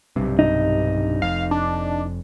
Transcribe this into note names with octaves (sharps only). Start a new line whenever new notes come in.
B1 G2 C3
D#4
F1 F2 F5
D4